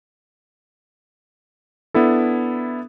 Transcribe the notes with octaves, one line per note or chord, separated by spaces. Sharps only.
B3 D4 E4 A4